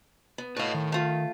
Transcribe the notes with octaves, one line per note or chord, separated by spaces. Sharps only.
B3
A2 B4 D#5 F5
D#3
A3 F4